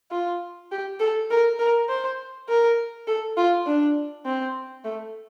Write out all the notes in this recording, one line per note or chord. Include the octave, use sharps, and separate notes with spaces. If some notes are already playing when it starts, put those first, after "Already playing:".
F4
G4
A4
A#4
A#4
C5
A#4
A4
F4
D4
C4
A3